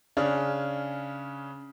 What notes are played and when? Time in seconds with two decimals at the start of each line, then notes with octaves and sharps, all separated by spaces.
0.17 C#3 C#4 D4